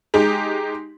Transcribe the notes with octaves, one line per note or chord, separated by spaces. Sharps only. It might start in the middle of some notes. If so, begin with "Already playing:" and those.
G#3 D#4 G4